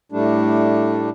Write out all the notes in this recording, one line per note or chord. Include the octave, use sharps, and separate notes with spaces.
A2 G3 A3 D4